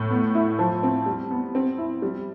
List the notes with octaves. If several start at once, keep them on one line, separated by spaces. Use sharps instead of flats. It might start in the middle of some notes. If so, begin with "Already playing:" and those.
Already playing: A2
B3
E4
F3
C4
G3
B3
C4
E4
G3